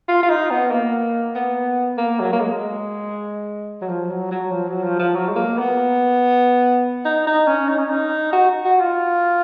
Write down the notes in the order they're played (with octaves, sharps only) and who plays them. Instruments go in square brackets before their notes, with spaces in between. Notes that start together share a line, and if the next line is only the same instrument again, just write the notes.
[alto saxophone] F4
F4
D#4
B3
A#3
B3
A#3
F#3
A#3
G#3
F#3
F3
F#3
F#3
F3
F#3
F3
F3
F#3
G#3
A#3
B3
D#4
D#4
C#4
D#4
C#4
D#4
F#4
F#4
F4